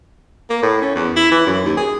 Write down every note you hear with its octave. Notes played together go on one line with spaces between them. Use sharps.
A#3
A2
C#4
E2
E4
E3
F#2
D#2
G#4